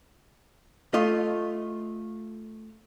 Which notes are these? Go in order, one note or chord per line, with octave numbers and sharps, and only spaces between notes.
A3 F4 D#5